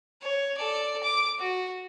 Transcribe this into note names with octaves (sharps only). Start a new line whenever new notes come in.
C#5
A4 D5
D6
F#4